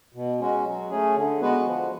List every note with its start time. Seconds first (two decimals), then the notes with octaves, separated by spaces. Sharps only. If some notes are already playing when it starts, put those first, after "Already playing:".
0.14 B2
0.40 G#3 C#4 F#4
0.65 F#3
0.90 A3 C#4 G#4
1.16 D3
1.40 G#3 B3 F#4 B4
1.66 F3